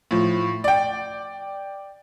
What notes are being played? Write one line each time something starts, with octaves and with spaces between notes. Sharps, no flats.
A2 F3
D5 G5